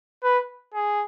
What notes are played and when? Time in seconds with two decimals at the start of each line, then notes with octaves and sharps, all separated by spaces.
0.23 B4
0.74 G#4